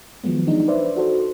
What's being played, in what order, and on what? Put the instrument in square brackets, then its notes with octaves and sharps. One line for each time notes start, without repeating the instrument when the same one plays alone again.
[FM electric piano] D#3 F3 F#3 G#3 B3
E3 G#3 D4 D#4
B4 C5 D5 E5
D#4 F#4 A4 C5